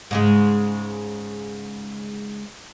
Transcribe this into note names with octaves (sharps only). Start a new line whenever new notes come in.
G#2 C#3 G#3